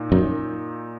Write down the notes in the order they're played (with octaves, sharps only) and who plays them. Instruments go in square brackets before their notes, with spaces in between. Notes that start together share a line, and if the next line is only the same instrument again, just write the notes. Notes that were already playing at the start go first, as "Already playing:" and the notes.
Already playing: [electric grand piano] A#2 D#4
[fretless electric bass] F#2 [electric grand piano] D#4